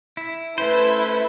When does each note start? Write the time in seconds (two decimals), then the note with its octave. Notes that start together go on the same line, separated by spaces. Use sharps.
0.17 E4
0.58 A3 C#4 E4 B4 C5